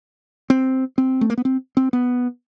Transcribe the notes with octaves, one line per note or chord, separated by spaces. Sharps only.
C4
C4
A3
A#3
B3
C4
C4
B3